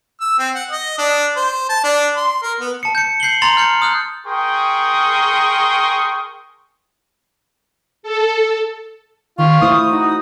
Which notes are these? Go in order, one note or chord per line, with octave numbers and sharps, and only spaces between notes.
E6
C4
F#5
D#5
D4
C5
A5
D4
C6
A#4
B3
A5 C#7
G6 C#7
G6 C7 F#7 G7
A#5 C6 A6 F7 F#7
F6 G6 C#7
D#6 F6 F#6
G#4 A#4 G5 C6 C#6 D#6
A4
D#3 F4 C#6
A3 E4 C5 D#6
D#4 F#4